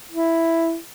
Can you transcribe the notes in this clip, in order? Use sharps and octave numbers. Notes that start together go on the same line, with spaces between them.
E4